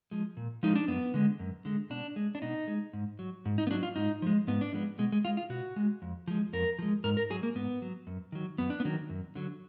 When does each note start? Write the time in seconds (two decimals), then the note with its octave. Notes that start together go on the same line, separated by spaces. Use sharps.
0.11 F3 G#3
0.37 A#2
0.63 F3 G#3 D#4
0.75 D4
0.88 F#2 B3
1.14 D3 G#3
1.39 F#2
1.65 D3 G#3
1.90 B2 D4
2.16 G#3
2.35 D4
2.42 B2 D#4
2.68 G#3
2.93 G#2
3.19 F#3
3.45 G#2
3.58 D#4
3.67 B3
3.71 F#3 D4
3.83 F4
3.96 G#2 D#4
4.22 F3 G#3
4.47 G#2 B3
4.61 D4
4.73 F3 G#3 B3
4.98 B2 G#3
5.12 G#3
5.25 G#3 F4
5.37 F4
5.50 B2 F#4
5.76 G#3
6.02 F2
6.28 F3 G#3
6.53 F2 A#4
6.79 F3 G#3
7.04 G#2 A#4
7.17 A#4
7.30 F#3 G#4
7.43 A#3
7.56 G#2 B3
7.82 F#3
8.07 F#2
8.32 D#3 F#3
8.58 F#2 B3
8.70 D4
8.80 B3
8.85 D#3 F#3
9.09 F#2
9.35 D3 F#3